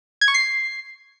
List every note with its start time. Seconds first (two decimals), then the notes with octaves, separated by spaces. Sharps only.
0.21 G#6
0.28 C#6
0.34 C7